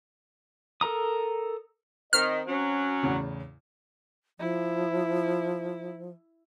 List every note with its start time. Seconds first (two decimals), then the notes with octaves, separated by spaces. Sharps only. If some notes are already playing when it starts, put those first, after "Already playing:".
0.81 A4 A#4 A#5 D#6
2.13 D#3 C4 D#5 F6
2.47 F#3 C#4
3.03 E2 A2 C#3
4.39 F3 E4